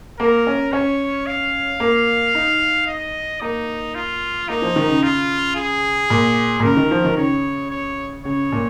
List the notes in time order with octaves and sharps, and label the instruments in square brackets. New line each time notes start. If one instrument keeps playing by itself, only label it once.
[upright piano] A#3 [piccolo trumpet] A#4
[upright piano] C#4
[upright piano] C#4 [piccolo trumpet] C#5
[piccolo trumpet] F5
[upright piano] A#3
D#4
[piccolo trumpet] D#5
[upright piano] A#3 [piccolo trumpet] D#4
[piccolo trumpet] F4
[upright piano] A#3 [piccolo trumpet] D#4
[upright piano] F3
D#3
C#3
[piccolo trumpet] F4
G#4
[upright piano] A#2
A#2
[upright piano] C#3 [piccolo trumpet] A#4
[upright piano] D#3
F3
D#3
[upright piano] C#3 [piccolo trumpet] C#5
[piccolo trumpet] C#5
[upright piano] C#3 [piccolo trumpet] C#5
[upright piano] A#2